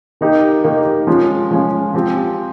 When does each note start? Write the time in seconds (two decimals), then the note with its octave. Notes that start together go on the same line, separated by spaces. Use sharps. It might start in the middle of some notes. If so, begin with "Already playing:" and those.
0.21 D#3 A#3 D#4 G4
0.64 D#3 A#3 D#4 G4
1.07 F3 G#3 C#4 F4
1.51 F3 G#3 C#4 F4
1.94 F3 C4 G4